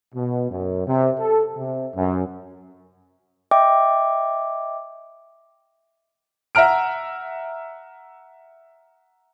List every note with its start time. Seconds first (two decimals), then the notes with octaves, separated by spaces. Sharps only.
0.15 B2
0.50 F#2
0.87 C3
1.19 A4
1.56 C3
1.95 F#2
3.51 D#5 E5 G5 D6
6.55 E5 F#5 A#5 F6 D7